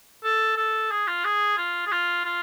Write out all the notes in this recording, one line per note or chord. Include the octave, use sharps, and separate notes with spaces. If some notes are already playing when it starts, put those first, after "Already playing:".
A4
A4
G#4
F4
G#4
F4
G#4
F4
F4